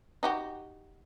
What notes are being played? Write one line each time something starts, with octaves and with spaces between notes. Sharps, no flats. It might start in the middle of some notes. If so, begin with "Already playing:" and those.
D#4 F#4 G4